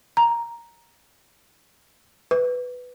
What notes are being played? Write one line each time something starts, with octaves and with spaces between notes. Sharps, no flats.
A#5
B4